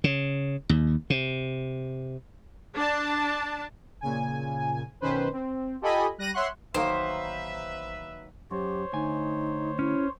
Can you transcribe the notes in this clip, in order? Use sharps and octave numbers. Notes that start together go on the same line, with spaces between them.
C#3
D#2
C3
D4 A5
A#2 C#3 G#5
B1 D#3 C#4 B4 C5
C4
F4 G4 A4 D#5 G#5 B5
G3 F#6 A#6 D#7
C#5 E5 F#5 C6 C#6 F#6
A1 D#3 F#3 A#3 B4 C5 E5
F#2 G4 C5 C#5
D2 D#4 G#5
C#4 E4